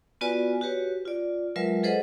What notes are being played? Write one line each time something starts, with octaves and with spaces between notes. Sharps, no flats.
B3 F4 F#4 B4 D5 G#5
F#4 G4 B4 C#5
F4 D5
F#3 G#3 F4 A#4 B4 E5
G#4 A4 B4 C5 D#5 F#5